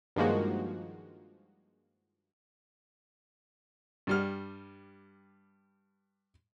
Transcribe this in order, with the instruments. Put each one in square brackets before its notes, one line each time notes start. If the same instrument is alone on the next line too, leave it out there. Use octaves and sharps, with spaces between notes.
[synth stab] G2 D#3 F3 G#3 A#3 F#4
[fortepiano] G2 G3 F6